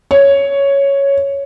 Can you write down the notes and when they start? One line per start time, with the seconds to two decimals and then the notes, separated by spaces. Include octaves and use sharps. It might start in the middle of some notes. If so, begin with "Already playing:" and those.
0.11 C#5